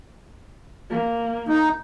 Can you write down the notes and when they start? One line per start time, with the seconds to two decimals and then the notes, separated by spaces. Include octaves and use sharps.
0.90 A#3
1.49 D#4